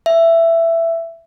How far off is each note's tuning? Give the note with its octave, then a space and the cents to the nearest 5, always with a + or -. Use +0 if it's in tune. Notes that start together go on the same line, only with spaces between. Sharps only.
E5 +15